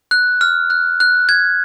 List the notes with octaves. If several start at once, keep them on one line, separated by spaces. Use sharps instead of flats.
F#6
F6
F#6
F#6
G#6